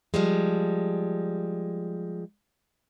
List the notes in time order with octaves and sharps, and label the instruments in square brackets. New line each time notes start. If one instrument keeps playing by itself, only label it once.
[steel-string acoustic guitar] F3 G3 G#3